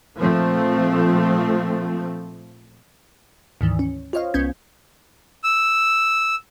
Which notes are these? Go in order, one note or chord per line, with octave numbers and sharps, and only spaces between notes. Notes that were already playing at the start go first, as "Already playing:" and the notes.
A#2 F3 A3 C4
D2 G#2 D#3 E3
C#4
F4 C5 C#5 D#5 F5
C2 B3 C#4 G6 G#6
E6